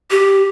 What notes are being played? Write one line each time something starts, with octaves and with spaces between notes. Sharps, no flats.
G4